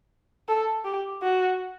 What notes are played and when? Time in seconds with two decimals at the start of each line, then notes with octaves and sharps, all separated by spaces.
0.48 A4
0.85 G4
1.23 F#4